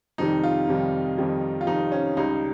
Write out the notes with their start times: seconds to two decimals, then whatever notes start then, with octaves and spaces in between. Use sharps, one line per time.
0.18 F2 C3 D#3 G3 D#4
0.44 F4
0.68 F2 C3 D#3 G3
1.18 F2 C3 D#3 G3
1.61 F4
1.67 F2 C3 D#3 G3 D#4
1.92 C#4
2.17 C#2 C#3 G3 D#4